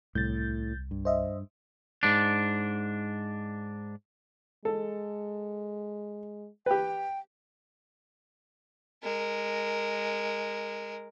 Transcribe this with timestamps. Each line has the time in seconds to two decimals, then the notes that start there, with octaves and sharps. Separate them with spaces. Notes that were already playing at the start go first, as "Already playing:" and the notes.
0.15 C2 A2 G6 A6
0.91 G2
1.05 C5 D#5 E5
2.03 G#2 D4
4.65 G#3 A4
6.66 G4 B4 G5
9.03 G#3 A#4